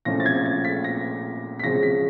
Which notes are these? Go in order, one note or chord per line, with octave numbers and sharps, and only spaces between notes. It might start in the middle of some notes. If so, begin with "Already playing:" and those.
A#2 F3 A3 C#4 E4 A#6
A6
G#6
A6
B6
A#6
B6
C#3 F3 G#3 C#4 A#6
B6